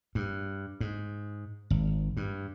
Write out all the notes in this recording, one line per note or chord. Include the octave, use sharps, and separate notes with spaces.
G2
G#2
G#1
G2